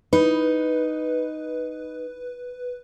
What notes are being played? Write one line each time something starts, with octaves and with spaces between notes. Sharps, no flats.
D#4 B4